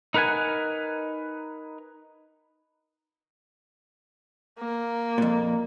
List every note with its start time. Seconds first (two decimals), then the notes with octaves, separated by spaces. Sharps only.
0.14 D#4 A#4 B4 F#5 G#5
4.59 A#3
5.18 F2 A#2